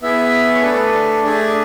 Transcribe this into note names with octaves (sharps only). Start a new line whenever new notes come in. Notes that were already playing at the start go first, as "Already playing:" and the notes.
B3 E4 G#4 E5
C#5
A3 D4 A4 B4
A4
A3 D4 G#4
D5